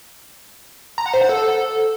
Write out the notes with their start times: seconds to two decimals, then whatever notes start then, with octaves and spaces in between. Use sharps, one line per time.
0.98 A#5
1.06 F#5
1.14 C5
1.21 F#5
1.29 A4